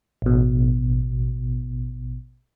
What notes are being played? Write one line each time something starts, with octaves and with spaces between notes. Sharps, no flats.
A1 B2